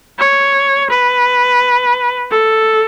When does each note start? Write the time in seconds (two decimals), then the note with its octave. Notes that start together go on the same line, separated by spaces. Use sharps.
0.19 C#5
0.90 B4
2.30 A4